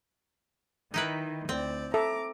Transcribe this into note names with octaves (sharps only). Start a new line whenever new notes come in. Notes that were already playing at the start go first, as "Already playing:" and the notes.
D#3 D#4 E4 B4
D2 C4 D5
A4 E5 A#5 D6